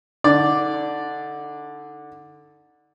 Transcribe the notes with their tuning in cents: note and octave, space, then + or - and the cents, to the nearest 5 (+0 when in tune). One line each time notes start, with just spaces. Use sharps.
D3 +0 D#4 +25 D5 +0